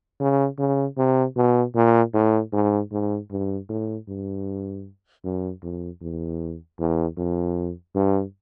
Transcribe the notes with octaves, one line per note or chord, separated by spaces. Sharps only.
C#3
C#3
C3
B2
A#2
A2
G#2
G#2
G2
A2
G2
F#2
F2
E2
E2
F2
G2